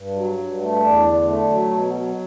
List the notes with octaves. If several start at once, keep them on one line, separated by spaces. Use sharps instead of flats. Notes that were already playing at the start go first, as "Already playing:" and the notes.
Already playing: G2
F#3
G2
A3
E2 D4
D3
A3
F#3
B2
F#3